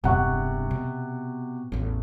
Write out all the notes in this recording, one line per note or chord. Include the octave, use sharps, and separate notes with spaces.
E1 G2 C3 F#5 C#6
B2
A1 E2